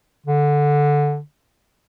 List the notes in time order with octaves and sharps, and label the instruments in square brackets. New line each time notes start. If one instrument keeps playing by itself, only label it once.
[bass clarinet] D3